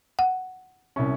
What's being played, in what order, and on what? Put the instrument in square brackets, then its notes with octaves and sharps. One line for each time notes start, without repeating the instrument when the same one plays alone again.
[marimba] F#5
[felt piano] C2 C3 C#4